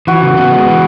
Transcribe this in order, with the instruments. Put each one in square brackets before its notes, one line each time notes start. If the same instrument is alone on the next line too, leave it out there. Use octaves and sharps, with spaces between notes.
[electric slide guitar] E3 [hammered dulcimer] F#4
[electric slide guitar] C#3
B3
G#3
E3